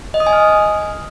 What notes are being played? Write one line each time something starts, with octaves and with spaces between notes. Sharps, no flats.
D#5
D#6
G#5
F6